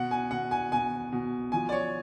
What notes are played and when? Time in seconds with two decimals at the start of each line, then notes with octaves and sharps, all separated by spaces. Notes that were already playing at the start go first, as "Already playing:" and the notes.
Already playing: B2 F#5
0.11 G#5
0.31 B2 F#5
0.51 G#5
0.72 B2 G#5
1.12 B2
1.52 F3 G#5
1.69 D5
1.72 C#5